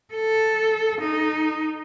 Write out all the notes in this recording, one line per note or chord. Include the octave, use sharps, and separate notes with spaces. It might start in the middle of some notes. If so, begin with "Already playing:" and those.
A4
D#4